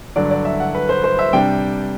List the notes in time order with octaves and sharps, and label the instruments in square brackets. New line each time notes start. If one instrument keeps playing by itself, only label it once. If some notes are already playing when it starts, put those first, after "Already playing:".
[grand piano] G2 D3 F#3 D5
D5
E5
F#5
B4
C5
C5
E5
C3 G3 D4 G5